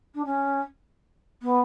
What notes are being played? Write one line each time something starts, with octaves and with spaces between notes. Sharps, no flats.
D4
C#4
B3